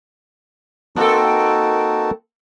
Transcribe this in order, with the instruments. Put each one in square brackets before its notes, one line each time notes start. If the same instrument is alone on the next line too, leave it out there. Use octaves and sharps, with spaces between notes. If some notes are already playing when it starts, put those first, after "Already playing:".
[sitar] A#3 C4 A4 [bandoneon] D#4 F#4 A5